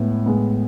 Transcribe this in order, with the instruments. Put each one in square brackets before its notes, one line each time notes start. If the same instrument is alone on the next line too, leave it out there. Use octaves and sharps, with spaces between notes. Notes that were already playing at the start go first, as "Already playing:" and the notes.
Already playing: [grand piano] A2 G#3 B3
A2 G#3 B3